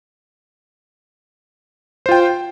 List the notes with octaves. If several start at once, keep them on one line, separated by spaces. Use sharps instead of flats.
F4 C5 G5